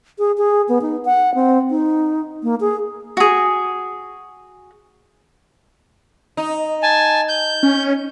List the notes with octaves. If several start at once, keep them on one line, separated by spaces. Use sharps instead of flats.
G#4
G#4
B3
D#4
F#5
C4
D#4
A#3
G#4
F#4 G#4
D#4
G#5 A5
G6
C#4